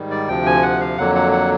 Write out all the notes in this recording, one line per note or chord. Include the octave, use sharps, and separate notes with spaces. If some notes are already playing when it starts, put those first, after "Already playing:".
Already playing: G#2 D#3 G3
D5
D2 C3 F3 G5
G#5
F#5
F5
F2 D3 F#3 A#3 F#5
F#5
F#5